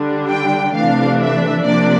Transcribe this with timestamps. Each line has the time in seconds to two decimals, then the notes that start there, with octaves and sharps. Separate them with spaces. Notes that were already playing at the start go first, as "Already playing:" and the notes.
Already playing: D3 G3 D4
0.29 G5
0.74 C3 E3 A3 D4 F5
1.20 E5
1.65 C3 F3 A#3 D4 D5